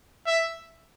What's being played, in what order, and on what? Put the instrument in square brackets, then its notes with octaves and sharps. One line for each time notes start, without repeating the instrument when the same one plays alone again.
[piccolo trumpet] E5